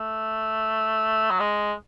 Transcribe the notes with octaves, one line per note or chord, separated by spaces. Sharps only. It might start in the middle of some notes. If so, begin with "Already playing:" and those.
Already playing: A3
F#3
G#3